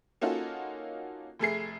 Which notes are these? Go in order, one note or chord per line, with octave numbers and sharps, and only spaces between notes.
A#3 C#4 D#4 F4 F#4 A4
F1 A3 G#4 C7